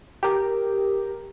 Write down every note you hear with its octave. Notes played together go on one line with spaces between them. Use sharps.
G4 A#4